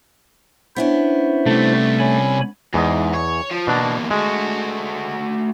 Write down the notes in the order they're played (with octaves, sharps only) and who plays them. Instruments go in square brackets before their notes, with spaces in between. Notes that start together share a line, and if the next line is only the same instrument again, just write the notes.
[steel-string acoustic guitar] B3 C#4 D4 [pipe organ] E4 C5 E5
[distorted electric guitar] C3 G3 [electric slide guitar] A3
[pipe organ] C#5 G#5 B5
[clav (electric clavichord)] E2 E3 D#5 [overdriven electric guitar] G#2
[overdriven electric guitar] C#5
F3
[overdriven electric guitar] E2 A#3 [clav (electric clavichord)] B2 D4
[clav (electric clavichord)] G#3 [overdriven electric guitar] A3 F#4